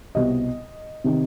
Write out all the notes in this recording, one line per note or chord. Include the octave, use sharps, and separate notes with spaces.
C2 B2 G3 D#5
C3 D#3